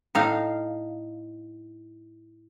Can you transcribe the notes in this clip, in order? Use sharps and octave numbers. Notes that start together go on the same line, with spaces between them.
A2 D#4 F5